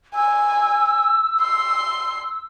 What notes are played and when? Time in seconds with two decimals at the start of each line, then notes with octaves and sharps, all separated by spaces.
0.15 G#5 E6
1.42 C6